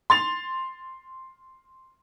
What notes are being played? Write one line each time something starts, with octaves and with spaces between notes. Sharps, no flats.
C6 A6 F7